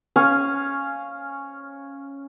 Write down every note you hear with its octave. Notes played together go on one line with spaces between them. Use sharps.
C#4 F5 G#5